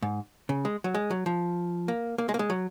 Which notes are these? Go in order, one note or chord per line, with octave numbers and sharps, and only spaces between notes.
G#2
C#3
G#3
F#3
G#3
F#3
F3
A#3
A#3
G#3
A#3
G#3
F#3